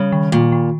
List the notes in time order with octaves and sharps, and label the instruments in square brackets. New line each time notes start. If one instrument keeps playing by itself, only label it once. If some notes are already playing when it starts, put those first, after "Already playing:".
Already playing: [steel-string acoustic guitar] C#3 [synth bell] G3
[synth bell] D#3
[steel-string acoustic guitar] A#2 [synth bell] D#3
[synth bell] D#3